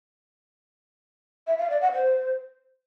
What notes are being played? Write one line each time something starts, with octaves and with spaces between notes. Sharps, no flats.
E5
F5
D5
F#5
C5